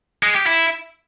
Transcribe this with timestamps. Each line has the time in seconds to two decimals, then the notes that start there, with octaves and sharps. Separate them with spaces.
0.23 G#3
0.35 G4
0.47 E4